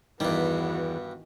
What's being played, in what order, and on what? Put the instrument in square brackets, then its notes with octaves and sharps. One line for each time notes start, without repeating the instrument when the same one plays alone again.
[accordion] E2 [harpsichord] G2 G3 [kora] D#3 E3 [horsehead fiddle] B3 F#4